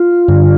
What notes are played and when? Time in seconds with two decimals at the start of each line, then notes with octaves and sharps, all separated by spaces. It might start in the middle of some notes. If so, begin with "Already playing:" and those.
Already playing: F4
0.28 G2 D3